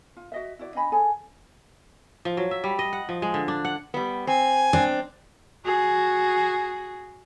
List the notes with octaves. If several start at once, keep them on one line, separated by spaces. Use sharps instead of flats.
F4
F#4 D#5 E5
E4 F#4 D5
D4 D#5 G#5 B5
G#4 A4 C#5 G#5
F3
F#3
E5
G3
D#5
F#5
F3
G#3
D3
D4
F#5
G3 B3
C4 G#5
C4 D4
F#4 G#4